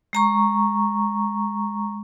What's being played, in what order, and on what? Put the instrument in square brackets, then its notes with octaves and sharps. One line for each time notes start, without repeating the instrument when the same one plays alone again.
[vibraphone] G#3 A#5 C#6